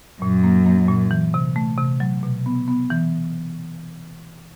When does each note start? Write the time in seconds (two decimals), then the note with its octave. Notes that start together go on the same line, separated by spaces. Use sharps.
0.21 F#2 A#2
0.44 A#3
0.66 A#3
0.89 A#2
1.11 E3
1.34 C3
1.56 A3
1.78 C3
2.00 F#3
2.23 B2
2.46 B3
2.68 B3
2.90 E3